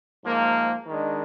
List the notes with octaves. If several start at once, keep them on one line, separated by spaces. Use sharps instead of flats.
G#2 F3 A#3
D#3 G#3 D4